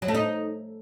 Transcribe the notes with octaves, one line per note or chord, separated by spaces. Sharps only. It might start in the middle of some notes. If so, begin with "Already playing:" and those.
F#3
A3
D#4